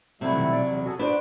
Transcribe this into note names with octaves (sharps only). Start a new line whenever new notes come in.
C3 F#3 G3 A3 E4
B2 D#3
D5
E2 B2
F#4 G#4 A4
D4 F#4 B4 C5 D5